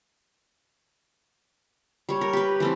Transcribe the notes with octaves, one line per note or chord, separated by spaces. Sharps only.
G3 C#5
A#4
G4 B4
E3 A3 C4